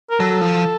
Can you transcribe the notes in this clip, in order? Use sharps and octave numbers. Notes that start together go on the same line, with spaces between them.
A#4
F#3 A4
F3